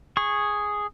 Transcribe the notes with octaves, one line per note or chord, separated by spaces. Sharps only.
G#4 C#6